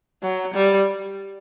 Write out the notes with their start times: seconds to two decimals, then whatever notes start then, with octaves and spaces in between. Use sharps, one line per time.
0.22 F#3
0.54 G3